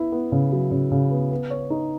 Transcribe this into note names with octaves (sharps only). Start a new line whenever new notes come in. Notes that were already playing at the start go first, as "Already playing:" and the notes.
Already playing: B3 E4
B3
C#3
F#3
C#3
C#3
B3
B3
C#5
D#4